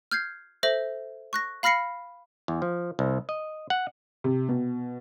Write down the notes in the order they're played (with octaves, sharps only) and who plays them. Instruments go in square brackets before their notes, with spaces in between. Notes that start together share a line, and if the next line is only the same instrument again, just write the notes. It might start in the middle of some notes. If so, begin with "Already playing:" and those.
[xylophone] F6 G6 G#6 C7
A4 C5 E5 A#6 F#7
C#6 F#6 A#6
F5 B5 F6 A#6 C7 C#7
[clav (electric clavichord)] E2
F3
C2
D#5
F#5
[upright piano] C3
B2